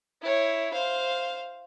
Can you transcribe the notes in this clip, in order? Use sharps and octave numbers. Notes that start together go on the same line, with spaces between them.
E4 C#5
C5 F5